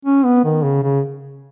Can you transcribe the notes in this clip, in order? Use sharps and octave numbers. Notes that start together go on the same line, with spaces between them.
C#4
B3
D#3
C#3
C#3